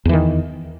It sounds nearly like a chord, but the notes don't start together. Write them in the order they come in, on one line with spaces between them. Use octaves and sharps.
E2 E3 D#3